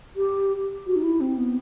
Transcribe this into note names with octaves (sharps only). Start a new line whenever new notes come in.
G4
F#4
D#4
E4
C4
B3